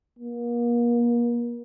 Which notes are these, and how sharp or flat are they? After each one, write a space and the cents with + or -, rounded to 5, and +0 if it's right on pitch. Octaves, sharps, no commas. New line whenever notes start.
A#3 +35